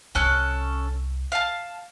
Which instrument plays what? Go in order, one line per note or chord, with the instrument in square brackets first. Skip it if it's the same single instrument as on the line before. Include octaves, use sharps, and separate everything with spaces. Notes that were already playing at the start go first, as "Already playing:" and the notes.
[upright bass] C2 [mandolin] C#4 A4 F#6
[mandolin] F5 A5